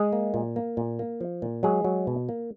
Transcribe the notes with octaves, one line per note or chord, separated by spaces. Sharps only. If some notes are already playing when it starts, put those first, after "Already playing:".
Already playing: G#3 G#4
A#3
A#2
A#3
A#2
A#3
F3
A#2
F#3 G#3 G#4
F#3
B2
A#3